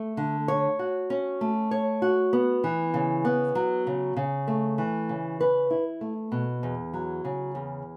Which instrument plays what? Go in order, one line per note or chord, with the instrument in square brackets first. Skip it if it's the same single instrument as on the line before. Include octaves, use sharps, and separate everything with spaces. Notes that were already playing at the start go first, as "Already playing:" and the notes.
Already playing: [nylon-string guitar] A3
D3
C#5
F#4
C#4
A3
C#5
F#4
B3
E3
C#3
B3
F#3
C#3
C#3
A3
E3
C#3
B4
E4
A3
B2
E2
F#3
C#3
E2